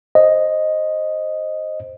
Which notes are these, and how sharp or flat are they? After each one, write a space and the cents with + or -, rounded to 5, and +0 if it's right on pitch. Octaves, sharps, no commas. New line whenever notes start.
C5 +10 D#5 +0